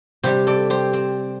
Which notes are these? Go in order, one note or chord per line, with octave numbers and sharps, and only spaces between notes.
C3 G3 G4 C5
A4 D5
G4 C5
C4